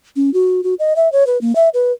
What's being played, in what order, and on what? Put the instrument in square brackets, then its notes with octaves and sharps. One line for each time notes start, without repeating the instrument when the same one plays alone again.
[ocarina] C#4
F#4
F#4
D#5
E5
C#5
B4
A#3
E5
B4